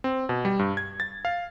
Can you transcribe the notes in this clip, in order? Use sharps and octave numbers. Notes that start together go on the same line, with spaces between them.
C4
B2
G3
G2
G#6
A6
F5